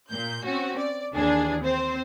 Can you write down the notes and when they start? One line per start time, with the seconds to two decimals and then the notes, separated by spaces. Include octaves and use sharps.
0.10 A#2 G6
0.45 C4 C#4 F#4
0.78 D5
1.14 D#2 E3 D4 G#4
1.63 C4 C5